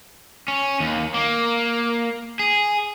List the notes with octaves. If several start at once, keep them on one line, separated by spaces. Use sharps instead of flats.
C#4
D#2
A#3
G#4